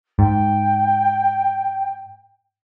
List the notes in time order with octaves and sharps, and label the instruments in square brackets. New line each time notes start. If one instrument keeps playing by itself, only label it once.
[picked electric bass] G#2 [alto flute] G5